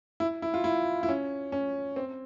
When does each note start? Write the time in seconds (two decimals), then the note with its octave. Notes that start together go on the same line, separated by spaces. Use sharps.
0.20 E4
0.42 E4
0.54 F4
0.64 E4
1.03 E4
1.09 C#4
1.52 C#4
1.96 C4